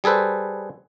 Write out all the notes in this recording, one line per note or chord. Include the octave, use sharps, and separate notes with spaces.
G3 G#4 A4 B4 C5